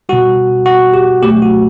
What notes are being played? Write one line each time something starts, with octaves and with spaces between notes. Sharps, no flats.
B2 G3 F#4
F#4
G4
B2 F#3 A3 G4
F#4